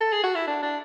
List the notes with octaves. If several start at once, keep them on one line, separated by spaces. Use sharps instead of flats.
A4
G#4
F#4
E4
D4
D4